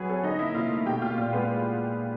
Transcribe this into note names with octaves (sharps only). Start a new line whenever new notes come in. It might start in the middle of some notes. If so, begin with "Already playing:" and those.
Already playing: F#3 B3 C#4 G#4 B4 C#5
C4 A4
D3 D#4 D#5
A#3 E4 E5
C3 F4 F5
A3
B2 G4 G5
A#3 F4 F5
A#2 F4 F5
G#3 B3 B4